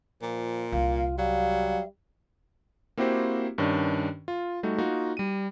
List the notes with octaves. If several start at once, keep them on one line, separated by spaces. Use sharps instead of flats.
A#2 F3
C2 D#4 F4 F5
F#3 G3 F5
A#3 C4 E4 F#4 G4 C5
G2 D#3 C#4 D4
F4
G3 A3 D#4 F#4
A#3 D#4 F4 F#4
G3 D#7